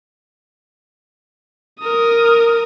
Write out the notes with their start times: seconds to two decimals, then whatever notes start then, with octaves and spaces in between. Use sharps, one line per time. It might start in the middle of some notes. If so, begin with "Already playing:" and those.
1.80 A#4 D#6